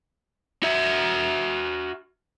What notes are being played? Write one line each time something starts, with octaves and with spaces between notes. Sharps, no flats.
F#4 E5